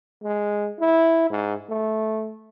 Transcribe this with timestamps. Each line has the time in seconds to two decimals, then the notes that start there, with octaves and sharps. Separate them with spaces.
0.23 G#3
0.80 E4
1.30 G#2
1.69 A3